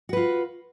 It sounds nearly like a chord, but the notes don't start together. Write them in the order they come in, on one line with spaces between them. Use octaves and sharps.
F#4 B4 F4